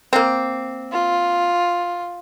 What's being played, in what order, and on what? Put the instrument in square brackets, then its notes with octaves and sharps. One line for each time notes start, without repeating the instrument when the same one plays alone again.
[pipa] A#3 C4
[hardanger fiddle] F4